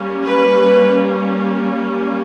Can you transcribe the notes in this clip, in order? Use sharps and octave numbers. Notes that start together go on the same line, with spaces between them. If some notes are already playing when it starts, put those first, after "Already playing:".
Already playing: G3 A#3 C#4
B4